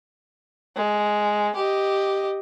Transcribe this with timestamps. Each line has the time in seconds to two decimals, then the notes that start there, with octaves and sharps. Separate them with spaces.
0.76 G#3
1.56 G4 D#5